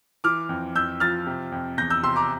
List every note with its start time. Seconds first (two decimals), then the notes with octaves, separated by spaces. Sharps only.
0.24 E3 D6 F6
0.49 F2
0.75 F2 E6 G6
1.00 F3 F6 A6
1.27 C3
1.52 F2
1.78 E2 G6 A#6
1.90 E6 G6
2.03 C3 C6 E6
2.16 A#5 D6